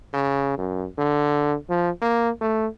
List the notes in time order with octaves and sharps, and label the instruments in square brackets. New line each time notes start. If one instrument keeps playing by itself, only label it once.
[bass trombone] C#3
F#2
D3
F3
A#3
A3